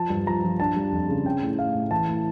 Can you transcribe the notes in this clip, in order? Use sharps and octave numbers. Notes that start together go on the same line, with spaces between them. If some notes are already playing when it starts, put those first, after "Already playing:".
Already playing: F3 A5
G2
F3 A#5
F3
D4 A5
G3
F2
C#3
C#4 G5
A2
A2 F5
A2
E3 A5
A2